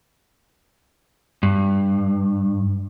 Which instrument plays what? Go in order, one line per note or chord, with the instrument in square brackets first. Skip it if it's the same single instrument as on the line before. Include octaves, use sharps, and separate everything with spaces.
[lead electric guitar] G2